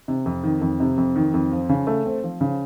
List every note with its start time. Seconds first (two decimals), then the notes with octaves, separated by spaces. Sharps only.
0.08 C3
0.26 F2
0.43 D#3
0.61 F2
0.80 C3
0.97 F2
1.16 D#3
1.34 F2
1.51 F3
1.69 C#3
1.87 A3
2.06 C4
2.24 F3
2.41 C#3